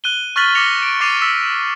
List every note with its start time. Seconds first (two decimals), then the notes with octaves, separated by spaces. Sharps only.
0.04 F#6 D#7 G7
0.36 C#6 F6 F#6 A6 B6 F#7
0.55 D6 A#6 C#7 F7
0.83 D7
1.00 C#6 D6 A6 C7 D#7 F7
1.22 E6 B6